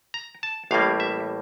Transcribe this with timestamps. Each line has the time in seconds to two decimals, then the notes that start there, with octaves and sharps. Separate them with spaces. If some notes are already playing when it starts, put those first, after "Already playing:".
0.14 A#5
0.43 A5
0.71 A1 A2 G3 A#3 F5
1.00 E5